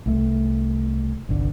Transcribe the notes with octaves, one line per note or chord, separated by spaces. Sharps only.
C2 A3
G1 C2 D3